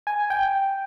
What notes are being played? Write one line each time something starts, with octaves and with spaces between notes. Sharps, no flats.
G#5
G5